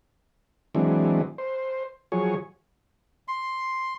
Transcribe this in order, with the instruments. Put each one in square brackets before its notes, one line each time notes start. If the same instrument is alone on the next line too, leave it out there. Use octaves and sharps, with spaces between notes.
[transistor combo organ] E3 F#3 G#3 C4 D4
C5
F3 F#3 G#4 C#5
[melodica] C6